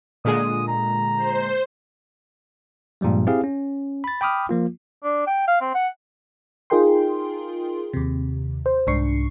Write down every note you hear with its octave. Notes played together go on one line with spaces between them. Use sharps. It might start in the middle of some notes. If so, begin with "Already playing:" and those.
A#2 D3 G#3 D#6
A#5
C5
G2 A#2 F3 G3 G#3
C4 E4 G4 G#4 F5
C#4
B5 A6
G5 B5 D6 D#6 F6
F3 A#3 F4
D4
G5
F5
C4
F#5
D#4 F4 G#4 A#4 G5 C6
D#2 C3
C5
C2 G#2 D4 C#6 C7